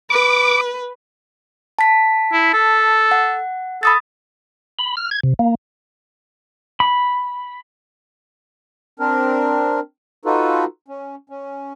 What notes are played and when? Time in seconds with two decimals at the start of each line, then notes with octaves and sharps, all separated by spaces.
0.10 B4 D6
1.79 A5 B6
2.33 E4
2.54 A4
3.11 F#5
3.83 A4 B5 D#6 A6
4.79 B5
4.97 F6
5.11 G#6
5.23 C3
5.39 A#3
6.80 B5
9.00 C4 D4 A#4
10.25 D#4 F4 F#4 A4 B4
10.88 C#4
11.30 C#4